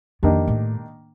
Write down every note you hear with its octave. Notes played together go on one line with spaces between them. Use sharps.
F2 D#3 A#3 D4 G4
A2